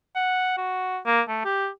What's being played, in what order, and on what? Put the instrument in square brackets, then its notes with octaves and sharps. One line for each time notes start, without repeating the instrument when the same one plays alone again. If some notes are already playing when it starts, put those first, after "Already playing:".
[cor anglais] F#5
F#4
A#3
A3
G4